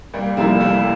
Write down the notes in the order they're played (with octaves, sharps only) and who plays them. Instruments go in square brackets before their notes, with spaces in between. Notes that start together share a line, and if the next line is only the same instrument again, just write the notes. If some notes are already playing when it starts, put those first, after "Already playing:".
[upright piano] C2 [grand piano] G3 A#3
[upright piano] C3 G3 A#3 E4 [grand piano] F3 A3
[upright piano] C2 [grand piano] E3 G3